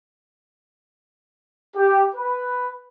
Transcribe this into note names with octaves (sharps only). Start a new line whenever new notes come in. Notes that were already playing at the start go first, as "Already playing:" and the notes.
G4
B4